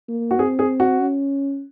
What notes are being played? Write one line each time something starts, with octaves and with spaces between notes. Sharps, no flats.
A#3
F#4
C4 G#4
G#4
F#4
C#4